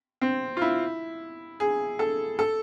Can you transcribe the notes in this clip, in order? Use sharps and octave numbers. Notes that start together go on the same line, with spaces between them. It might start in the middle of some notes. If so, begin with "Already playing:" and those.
C4
F4
E4
G#4
A4
A4